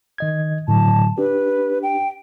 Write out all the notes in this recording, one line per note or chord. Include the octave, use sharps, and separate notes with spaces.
D#3 D#5 G#6
A2 D3 F#3 A5
D4 G4 B4
G5